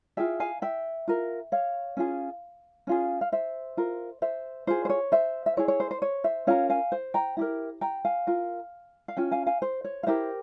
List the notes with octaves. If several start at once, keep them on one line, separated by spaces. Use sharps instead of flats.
F4 G#4 E5 G5
F5 G#5
E5 G5
F4 A#4
C#5 F5
C#4 F4 G#4
C#4 F4 G#4
F5
C5 E5
F4 A#4
C5 E5
F4 G#4 C5
C5
C#5
C5 E5
E5
E4 G#4 C#5
C#5
C5
C5
C#5
C5 E5
C#4 F4 A#4 C#5 F5
F5 G#5
C5
G5 A#5
E4 G4 A#4
G5 A#5
F5 G#5
F4 A#4
F5
C#4 F4 G5
F5 G#5
F5 G#5
C5
C#5
F5
E4 G4 A#4 C5 E5